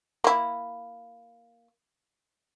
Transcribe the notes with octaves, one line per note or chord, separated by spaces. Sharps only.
A#3 E4